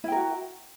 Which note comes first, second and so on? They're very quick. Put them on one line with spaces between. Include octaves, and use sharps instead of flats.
E4 G5 A#4 F#4